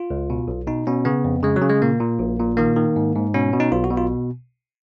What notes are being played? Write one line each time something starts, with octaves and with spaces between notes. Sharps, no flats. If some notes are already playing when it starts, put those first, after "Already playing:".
Already playing: F4
C#2
B2
B1
B2 D#4
B2 C#4
C#3 B3
F2
C#3 G#3
F#3
C#3
G#3
A#2 A#3
A#2
A#1
A#2
D#3 A#3
D#3
G#2
G#2
B2 C#4
B2
D#4
B1 F4
F#4
B2
F4